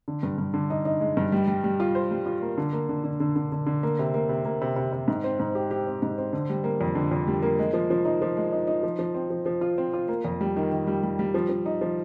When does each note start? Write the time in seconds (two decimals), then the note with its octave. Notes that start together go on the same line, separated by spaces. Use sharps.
0.08 D3
0.23 G2
0.38 G2
0.54 D3
0.70 D#4
0.85 D#4
1.00 G#3
1.17 G2
1.32 G3
1.47 G3
1.64 G3
1.80 F4
1.95 C5
2.11 G3
2.26 F4
2.42 A#3
2.58 D3
2.73 A#3
2.89 D3
3.04 D3
3.20 D3
3.36 D3
3.52 D3
3.67 D3
3.83 A#3
3.99 C3
4.14 A#3
4.29 C3
4.45 A#3
4.61 C3
4.76 C3
4.92 C3
5.08 G#2
5.24 C4
5.40 G#2
5.55 G4
5.71 G4
5.87 C4
6.02 G#2
6.18 C4
6.33 D3
6.49 G3
6.64 A#3
6.81 F2
6.95 D3
7.11 F2
7.27 G3
7.42 A#3
7.59 G#3
7.74 F3
7.90 F3
8.05 D#4
8.22 F3
8.37 G#3
8.52 D#4
8.67 D#4
8.83 F3
8.99 F3
9.14 C4
9.30 F3
9.46 F3
9.61 F4
9.78 C4
9.93 F4
10.08 A#3
10.25 F2
10.41 G3
10.56 D#3
10.72 D#3
10.87 G3
11.03 G3
11.19 G3
11.34 F3
11.49 F3
11.66 D#4
11.81 F3